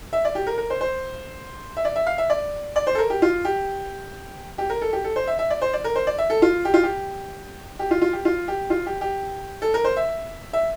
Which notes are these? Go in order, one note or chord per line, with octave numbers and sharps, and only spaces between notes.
E5
D5
G4
A#4
A#4
C5
C5
E5
D5
E5
F5
E5
D5
D5
C5
A4
A#4
G4
F4
G4
G4
A#4
A4
G4
A4
C5
E5
E5
D5
C5
D5
A#4
C5
D5
E5
A4
F4
G4
F4
G4
G4
F4
F4
G4
F4
G4
F4
G4
G4
A4
A#4
C5
E5
E5